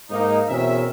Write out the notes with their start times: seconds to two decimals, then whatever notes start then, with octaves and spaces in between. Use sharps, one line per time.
0.11 G#2 A#3 D#4
0.49 E2 B2 C4 C#4 A#4 E5